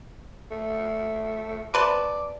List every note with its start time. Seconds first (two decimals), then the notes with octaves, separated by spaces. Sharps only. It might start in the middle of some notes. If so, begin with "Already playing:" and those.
0.51 A3
1.74 C3 B4 D5 A5